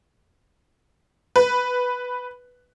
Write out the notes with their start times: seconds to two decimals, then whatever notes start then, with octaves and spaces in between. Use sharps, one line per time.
1.36 B4